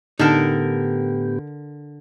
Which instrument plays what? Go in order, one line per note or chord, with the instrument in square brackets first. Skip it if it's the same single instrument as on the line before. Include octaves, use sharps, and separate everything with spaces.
[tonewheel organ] A2 B3 G4 [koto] D3 A#4 [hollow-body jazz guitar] D#4 A5